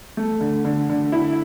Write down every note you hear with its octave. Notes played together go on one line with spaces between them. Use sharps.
A3
D3
D3
D3
E4